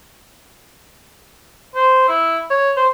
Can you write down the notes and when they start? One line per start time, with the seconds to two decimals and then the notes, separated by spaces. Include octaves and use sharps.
1.76 C5
2.09 E4
2.50 C#5
2.77 C5